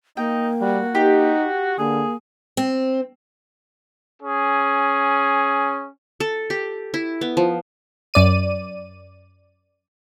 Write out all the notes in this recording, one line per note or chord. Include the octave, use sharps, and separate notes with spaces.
A#3 D#4 G5
G3 F#4
D#4 G4
D3 A#3 G#4
C4
C#4 G#4
A4
G4
E4
B3
F3
F#2 D5 D#7